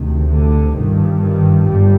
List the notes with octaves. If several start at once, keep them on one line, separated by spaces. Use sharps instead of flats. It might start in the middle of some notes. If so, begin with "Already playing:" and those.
Already playing: D2 C3 D#3
D3
G1 G2 D#3
D#3
G1 G2 G3